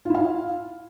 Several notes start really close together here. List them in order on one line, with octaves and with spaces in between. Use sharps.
F4 E4 F5